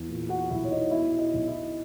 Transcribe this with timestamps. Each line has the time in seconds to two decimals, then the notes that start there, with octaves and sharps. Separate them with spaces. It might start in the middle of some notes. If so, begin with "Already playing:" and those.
Already playing: E2
0.09 A#2
0.29 F#4 F#5
0.50 B1 E4 E5
0.64 C#5
0.71 D#4 D#5
0.91 B2 E4 E5
1.19 D#4 D#5
1.34 B1
1.47 E4 E5